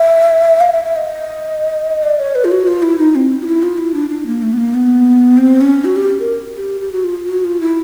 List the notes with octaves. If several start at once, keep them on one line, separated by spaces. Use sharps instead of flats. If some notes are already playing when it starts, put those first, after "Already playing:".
Already playing: E5
F5
E5
E5
D#5
D5
C#5
B4
F4
F#4
F4
E4
D#4
C4
F4
E4
F4
E4
D4
D4
A#3
A3
B3
A#3
B3
C4
C#4
F#4
G4
A#4
G4
G4
F#4
F4
F#4
F4
E4